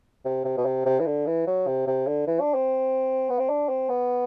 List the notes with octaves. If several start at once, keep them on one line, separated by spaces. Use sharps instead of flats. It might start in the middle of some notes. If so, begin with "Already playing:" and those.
C3
C3
B2
C3
C3
E3
D3
E3
F#3
C3
C3
D3
E3
D4
C4
B3
C4
D4
C4
B3